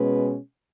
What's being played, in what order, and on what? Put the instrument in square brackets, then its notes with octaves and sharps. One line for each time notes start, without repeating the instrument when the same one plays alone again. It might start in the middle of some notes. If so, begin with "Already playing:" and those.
Already playing: [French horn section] B2 G#3 C#4 B4